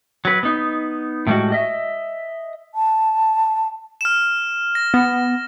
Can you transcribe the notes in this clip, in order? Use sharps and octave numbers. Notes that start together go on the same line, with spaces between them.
F#3 B4
B3 D#4
A2 D#3 G3 G#3 F#4
D#5 E5
A5
F6 E7
A#6
B3